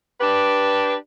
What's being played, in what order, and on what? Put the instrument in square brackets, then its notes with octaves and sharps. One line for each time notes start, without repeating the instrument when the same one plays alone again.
[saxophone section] D4 G4 B4